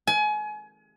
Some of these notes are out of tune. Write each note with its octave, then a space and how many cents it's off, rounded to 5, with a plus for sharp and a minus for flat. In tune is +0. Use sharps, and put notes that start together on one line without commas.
G#5 +30